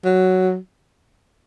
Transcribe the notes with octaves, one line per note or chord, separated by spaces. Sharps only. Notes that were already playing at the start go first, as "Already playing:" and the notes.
F#3